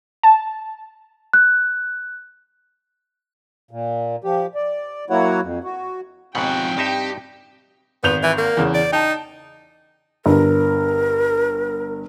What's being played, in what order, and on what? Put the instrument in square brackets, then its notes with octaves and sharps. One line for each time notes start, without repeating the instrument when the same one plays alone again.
[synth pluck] A5
[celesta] F#6
[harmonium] A#2
F3 G4
D5
F#3 A#3 E4 F#4 C#5 F#5
F2
F#4
[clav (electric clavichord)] D#2 G#2 B2 [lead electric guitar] F3 F#5 [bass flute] C4 [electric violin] G5
[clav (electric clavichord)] G2 D#4 E5 [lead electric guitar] G4
[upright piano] G#1 G6 F7 [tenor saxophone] B3
[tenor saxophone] E3
A#3
[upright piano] E2 C#3
[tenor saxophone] D5
[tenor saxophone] D#4 [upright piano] G5 A5
[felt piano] G1 [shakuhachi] A#4